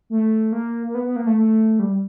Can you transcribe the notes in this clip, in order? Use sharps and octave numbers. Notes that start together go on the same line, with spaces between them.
A3
A#3
A#3
B3
B3
A#3
A3
A3
G3